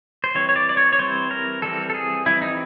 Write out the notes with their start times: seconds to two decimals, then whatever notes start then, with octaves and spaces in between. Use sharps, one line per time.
0.24 C5
0.35 E3 G3 C4 C#5
0.49 C#5
0.56 D5
0.69 D5
0.77 C#5
0.93 C#5
0.99 E3 G3 C4 C5
1.31 A#4
1.62 E3 G3 C4 A4
1.90 A4
1.94 G#4
2.26 E3 G3 C4 E4
2.42 D#4